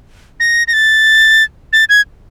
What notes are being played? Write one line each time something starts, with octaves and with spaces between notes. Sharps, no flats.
A#6
A#6
A6
A6
G#6